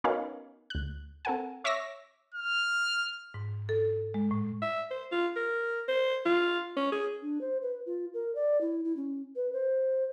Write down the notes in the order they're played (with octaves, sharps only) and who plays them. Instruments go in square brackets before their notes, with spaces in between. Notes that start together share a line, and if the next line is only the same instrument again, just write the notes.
[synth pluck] B3 C#4 D#4 F#4 A#4 F5
D2 F#6
C4 A4 A#4 F#5 G#5
C#5 E5 C#6 D6 E6 A#6
[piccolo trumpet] F6
[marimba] G#2
A4
G#3
A2
[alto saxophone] E5
C5
F4
A#4
C5
F4
C#4
G#4
[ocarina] D4
C5
B4
F4
A#4
D5
E4
E4
C#4
B4
C5